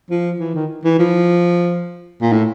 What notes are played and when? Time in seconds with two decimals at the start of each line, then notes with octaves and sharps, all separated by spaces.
0.11 F3
0.40 E3
0.55 D#3
0.85 E3
0.99 F3
2.22 A#2
2.33 A2